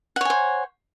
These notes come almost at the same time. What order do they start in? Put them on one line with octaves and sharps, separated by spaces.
F#5 C#5 G#5 C5